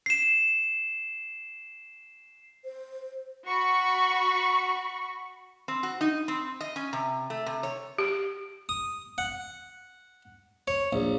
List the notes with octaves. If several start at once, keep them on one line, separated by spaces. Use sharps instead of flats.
C7 E7
C5
F#4 B5 C#6
C4
F#4
D#4
C4
D#5
C#4
C3
A3
C3
C#5
G4
D#6
F#5
C#5
A#1